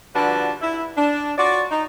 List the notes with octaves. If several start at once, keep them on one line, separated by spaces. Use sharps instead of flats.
D3 F3 G3 D4 F#4 B4
E4
D4
F4 F#4 C#5 D5
D#4